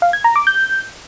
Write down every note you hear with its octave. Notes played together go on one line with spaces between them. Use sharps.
F5
G#6
A#5
D6
G6